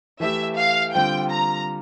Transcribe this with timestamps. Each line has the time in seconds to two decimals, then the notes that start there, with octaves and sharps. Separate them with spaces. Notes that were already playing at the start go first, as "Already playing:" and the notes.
0.20 E3 A3 E4 G4 E5
0.57 F5
0.94 D3 G3 C4 F4 G5
1.31 A#5